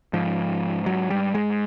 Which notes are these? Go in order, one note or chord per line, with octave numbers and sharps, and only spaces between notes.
G#2 F3
F#3
G3
G#3